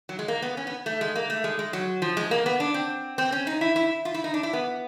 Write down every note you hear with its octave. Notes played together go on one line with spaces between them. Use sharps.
F#3
G#3
A#3
B3
C#4
B3
A3
G#3
A#3
A3
G#3
G#3
F#3
F3
G#3
A#3
B3
D4
C4
C4
C#4
D#4
E4
E4
F4
E4
D#4
D4
E4
B3